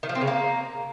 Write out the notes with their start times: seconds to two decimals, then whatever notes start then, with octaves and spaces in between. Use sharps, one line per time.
0.03 D#3
0.09 F3
0.15 C4
0.21 C#3
0.27 A#3